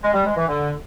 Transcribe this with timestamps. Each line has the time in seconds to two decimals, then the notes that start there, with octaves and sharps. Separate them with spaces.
0.02 G#3
0.13 G3
0.24 G#3
0.35 E3
0.47 D3